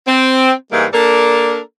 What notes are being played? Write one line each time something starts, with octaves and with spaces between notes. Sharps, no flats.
C4
G#2 E3 G3 G#3 A#3
A#3 D4 A4 A#4 D5